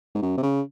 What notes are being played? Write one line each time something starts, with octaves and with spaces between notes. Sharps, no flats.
G#2
F#2
C3
C#3